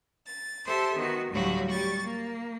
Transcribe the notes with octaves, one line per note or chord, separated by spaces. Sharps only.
A6
G4 A4 C5 E5 C6
D#3 B3 F#4
D2 A2 F#3 G3 F#4 F5
G3 C#6 A6
A#3